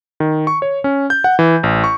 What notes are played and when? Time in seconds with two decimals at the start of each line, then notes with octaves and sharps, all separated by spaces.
0.20 D#3
0.47 C#6
0.62 C#5
0.84 C#4
1.10 G6
1.24 F#5
1.39 E3
1.63 A1
1.84 C#6